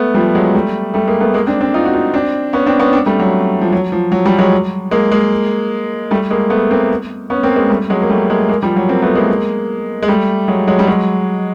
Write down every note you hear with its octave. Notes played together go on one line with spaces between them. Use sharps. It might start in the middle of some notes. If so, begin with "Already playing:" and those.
Already playing: A3 B3
F3 G3
F#3 G#3
G3 A3
G3 A3
G#3 A#3
A3 B3
G#3 A#3
C4 D4
C4 D4
D#4 F4
F#4
D#4 F4
C4 D4
B3 C#4
C4 D4
B3 C#4
C4 D4
G3 A3
F#3
F3
F#3
F3
F#3
F3 G3
F#3 G#3
G#3 A#3
G#3 A#3
G3 A3
G#3 A#3
A3 B3
A#3 C4
B3 C#4
A#3 C4
G#3 A#3
G3 A3
F#3 G#3
A#3
G3 A3
G#3 A#3
G#3 A#3
F3 G3
F#3
A#3 C4
A3 B3
G#3 A#3
G#3
G3 A3
F#3 G#3
F#3 G#3
G3
F#3 G#3